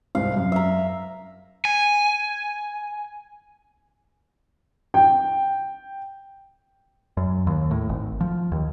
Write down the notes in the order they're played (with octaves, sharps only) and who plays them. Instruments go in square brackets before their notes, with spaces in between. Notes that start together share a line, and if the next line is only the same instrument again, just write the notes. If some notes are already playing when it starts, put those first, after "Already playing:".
[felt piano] C2 G#2 [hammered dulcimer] F5
[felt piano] F#2
[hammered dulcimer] E5 A#5
[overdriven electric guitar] G#5
[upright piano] G5
[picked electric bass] F#2
D#2
A2
G#1
F3
D#2